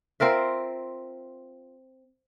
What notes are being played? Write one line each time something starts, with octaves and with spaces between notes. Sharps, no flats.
C4 F4 A#4 E5